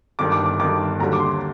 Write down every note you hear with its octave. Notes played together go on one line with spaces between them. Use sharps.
G1 G2 D#3 D6
D6
D6
G1 G2 D#3 D6
D#2 D3 G3 A#5
D6
C6